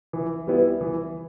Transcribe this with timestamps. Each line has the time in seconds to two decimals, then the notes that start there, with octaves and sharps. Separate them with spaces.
0.13 E3
0.47 G3 B3 E4 B4
0.81 E3